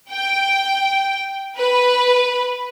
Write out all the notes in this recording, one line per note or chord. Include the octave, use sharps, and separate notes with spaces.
G5
B4